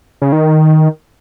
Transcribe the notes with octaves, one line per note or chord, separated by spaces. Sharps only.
C#3
D#3